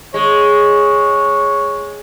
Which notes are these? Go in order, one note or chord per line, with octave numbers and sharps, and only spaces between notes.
G#3 C#5